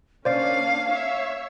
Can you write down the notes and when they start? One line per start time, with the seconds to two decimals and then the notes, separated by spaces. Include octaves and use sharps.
0.25 A#3 C#4 D4 C5 D5 F5
0.90 C#5 E5